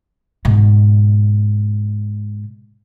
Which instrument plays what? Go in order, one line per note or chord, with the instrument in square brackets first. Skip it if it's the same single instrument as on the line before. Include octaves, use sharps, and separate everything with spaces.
[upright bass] G#2 B2